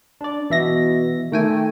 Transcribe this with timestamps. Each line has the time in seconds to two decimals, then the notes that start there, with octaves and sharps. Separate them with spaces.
0.21 D4 D5
0.50 B2 E3 E5 A#6
1.32 D#3 A3 G5 G#5